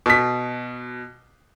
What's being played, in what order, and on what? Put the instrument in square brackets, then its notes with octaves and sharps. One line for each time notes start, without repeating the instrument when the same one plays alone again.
[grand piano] B2 B6